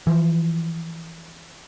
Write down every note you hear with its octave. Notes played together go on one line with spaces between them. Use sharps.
E3 F3